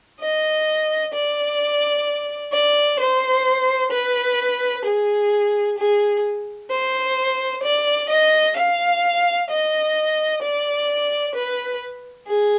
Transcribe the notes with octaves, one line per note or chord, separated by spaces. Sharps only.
D#5
D5
D5
C5
B4
G#4
G#4
C5
D5
D#5
F5
D#5
D5
B4
G#4